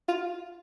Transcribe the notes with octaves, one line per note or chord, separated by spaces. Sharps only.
F4